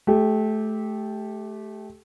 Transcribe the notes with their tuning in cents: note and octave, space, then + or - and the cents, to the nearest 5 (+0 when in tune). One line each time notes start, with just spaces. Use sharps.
A3 -25 G4 +0